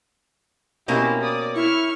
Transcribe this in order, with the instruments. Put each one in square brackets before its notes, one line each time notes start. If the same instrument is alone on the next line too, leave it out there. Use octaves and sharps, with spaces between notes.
[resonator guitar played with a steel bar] B2 A#3 C4 [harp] C#4 A#4 [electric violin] E4 G4
[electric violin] D5 D#6
[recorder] E4 [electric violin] C#6 F6